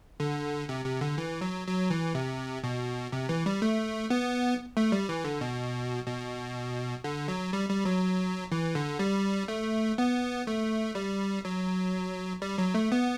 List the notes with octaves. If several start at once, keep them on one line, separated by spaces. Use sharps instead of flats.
D3
C3
C3
D3
E3
F#3
F#3
E3
C3
B2
C3
E3
G3
A3
B3
A3
G3
E3
D3
B2
B2
D3
F#3
G3
G3
F#3
E3
D3
G3
A3
B3
A3
G3
F#3
G3
F#3
A3
B3